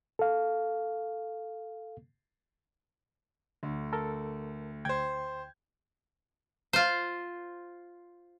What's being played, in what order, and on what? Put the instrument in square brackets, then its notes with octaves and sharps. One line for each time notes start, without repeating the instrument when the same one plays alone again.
[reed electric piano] A4 F5
[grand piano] D2 [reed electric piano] D3
[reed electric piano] A4 A#4
[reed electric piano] D2 G5 [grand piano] C5 G#6
[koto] F4 C5